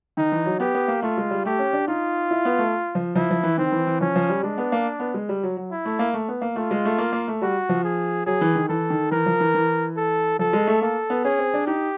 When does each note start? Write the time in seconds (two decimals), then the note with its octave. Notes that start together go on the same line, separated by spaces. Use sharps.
0.17 D#3 D#4
0.32 E3
0.46 F#3
0.60 B3 G4
0.75 B3
0.88 A#3
1.02 A3 F4
1.18 G#3
1.31 G3
1.45 A3 G4
1.59 C#4
1.73 D4
1.88 D#4 F4
2.31 E4
2.45 B3
2.58 A3
2.95 F3
3.15 F3 E4
3.30 F3
3.44 E3
3.58 D#3 C4
3.72 E3
3.87 E3
4.01 F3 C#4
4.16 F3
4.29 G3
4.43 G#3 D4
4.58 B3
4.72 A#3
5.00 B3
5.14 G#3
5.29 G3
5.43 F#3
5.57 F#3
5.71 E4
5.85 A3
5.99 A#3
6.13 A3
6.28 B3
6.42 A#3
6.56 A3 F4
6.71 G#3
6.85 A3
6.98 A#3
7.12 A#3
7.28 A3
7.42 G3 F#4
7.69 F3
7.84 G#4
8.26 F#3 G#4
8.41 E3
8.55 D#3
8.69 E3 A4
8.90 D#3
9.11 E3 A#4
9.26 F3
9.40 E3
9.55 E3
9.97 A4
10.39 F3 A4
10.53 G#3
10.67 A3
10.82 A#3 A4
11.10 B3
11.24 C#4 G#4
11.39 C4
11.54 D4
11.67 D#4 G4